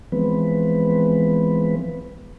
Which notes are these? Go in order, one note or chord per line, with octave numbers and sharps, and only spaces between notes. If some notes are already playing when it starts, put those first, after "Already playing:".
E3 F3 G#3 B3 C4 B4